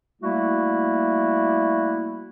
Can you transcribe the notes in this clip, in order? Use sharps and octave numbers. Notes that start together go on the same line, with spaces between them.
G3 A3 A#3 E4 F#4